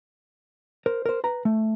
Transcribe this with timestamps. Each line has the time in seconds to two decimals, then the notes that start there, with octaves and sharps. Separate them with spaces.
0.86 A#4 C5
1.06 A#4 C5
1.24 B4 A#5
1.45 A3